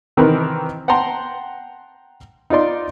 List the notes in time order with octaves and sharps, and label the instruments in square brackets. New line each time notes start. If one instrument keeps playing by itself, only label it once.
[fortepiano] C3 D#3 E3 C4 A#4 B4
F#5 G5 A5 A#5 C6
D#4 F4 D5 C6